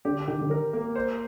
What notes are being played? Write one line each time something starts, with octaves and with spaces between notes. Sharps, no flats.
D3 G4
D#3 G4
D3
D#3 A#4
A#3
C5